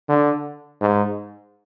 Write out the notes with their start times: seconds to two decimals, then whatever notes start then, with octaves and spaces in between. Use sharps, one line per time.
0.09 D3
0.81 G#2